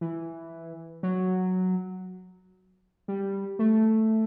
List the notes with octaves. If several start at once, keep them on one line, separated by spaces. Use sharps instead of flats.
E3
F#3
G3
A3